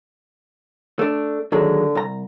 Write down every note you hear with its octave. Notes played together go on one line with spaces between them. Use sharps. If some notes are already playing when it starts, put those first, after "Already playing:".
A3 D4
D#2 D3 F#3 G#3
C2 A#5